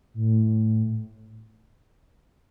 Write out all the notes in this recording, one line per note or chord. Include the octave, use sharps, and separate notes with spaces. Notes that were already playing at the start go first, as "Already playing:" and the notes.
A2